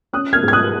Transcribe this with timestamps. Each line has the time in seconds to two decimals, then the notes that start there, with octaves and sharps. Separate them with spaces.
0.13 C#4 D#6 F#6
0.33 F6 G#6
0.43 G#2 G#6
0.53 D#6 F#6